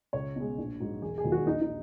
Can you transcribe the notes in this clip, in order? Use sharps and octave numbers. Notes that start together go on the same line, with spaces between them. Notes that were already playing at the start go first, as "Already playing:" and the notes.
C#2 C#5
B2 G#3
A#1
G#2 F#3
E1 G#4
G#4
D#2 D#3 F#3
F#4
A#1 D#4
D#4